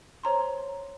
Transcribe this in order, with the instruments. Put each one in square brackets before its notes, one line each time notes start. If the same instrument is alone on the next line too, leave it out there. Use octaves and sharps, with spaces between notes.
[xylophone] C5 C#5 A#5 C6